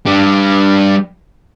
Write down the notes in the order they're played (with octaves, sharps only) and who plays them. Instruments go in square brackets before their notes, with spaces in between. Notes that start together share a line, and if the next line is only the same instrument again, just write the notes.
[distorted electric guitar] G3 D4